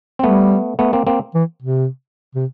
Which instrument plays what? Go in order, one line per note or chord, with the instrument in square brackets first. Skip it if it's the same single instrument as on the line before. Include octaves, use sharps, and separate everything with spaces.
[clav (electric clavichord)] C4
[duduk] G3 [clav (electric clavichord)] A3 B3
[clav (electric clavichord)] A3 B3
A#3 C4
A#3 C4
[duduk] E3
C3
C3